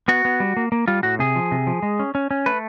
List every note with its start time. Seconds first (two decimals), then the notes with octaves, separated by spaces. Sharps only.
0.08 B3 F#4
0.25 B3
0.40 G3
0.57 A#3
0.72 A#3
0.88 G3 F4
1.03 A2 F#4
1.19 C3 G#4
1.36 F3
1.52 C3
1.67 F3
1.83 G#3
1.99 C#4
2.15 C#4
2.31 C#4
2.46 A3 B4